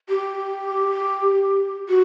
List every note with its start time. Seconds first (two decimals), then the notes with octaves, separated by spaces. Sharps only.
0.09 G4
1.89 F#4